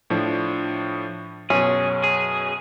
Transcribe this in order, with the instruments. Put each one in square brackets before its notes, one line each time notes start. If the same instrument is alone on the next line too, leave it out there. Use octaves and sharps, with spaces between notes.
[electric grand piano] A2 F3 D4
[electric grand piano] F#2 B2 [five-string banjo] C#4 [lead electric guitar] G#4
[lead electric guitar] G#4